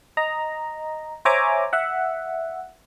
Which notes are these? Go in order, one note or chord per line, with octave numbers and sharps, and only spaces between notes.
D#5 A#5
C5 C#5 E5 G#5 A#5 D6
E5 F#5